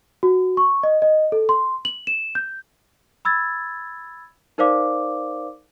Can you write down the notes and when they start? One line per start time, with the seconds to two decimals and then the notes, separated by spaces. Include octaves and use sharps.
0.23 F#4
0.57 C#6
0.83 D#5
1.02 D#5
1.32 A4
1.49 C6
1.85 F#7
2.07 E7
2.35 G6
3.25 B5 E6 G#6 A6
4.58 D#4 A#4 C5 D5 F5 D6